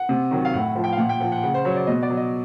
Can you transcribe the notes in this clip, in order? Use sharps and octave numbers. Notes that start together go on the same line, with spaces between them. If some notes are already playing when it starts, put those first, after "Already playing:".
Already playing: F#5
C3
D#3 F#3
F5
A2 F#5
F3
G5
F5
A#2 F#5
G5
F3 F#5
F#5
C#3 F#5
C5
F#3 C#5
D5
B2 D#5
D5
F#3
D#5